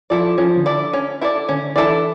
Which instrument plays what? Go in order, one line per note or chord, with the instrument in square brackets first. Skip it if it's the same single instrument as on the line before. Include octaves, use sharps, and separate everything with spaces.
[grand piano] F3 [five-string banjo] E4 A4 D5
[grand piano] F3 [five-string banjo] C#4
[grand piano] D3
[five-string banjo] E4 A4 D5
C#4
E4 A4 D5
[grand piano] D3 [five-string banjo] C#4
[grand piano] E3 [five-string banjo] E4 A4 D5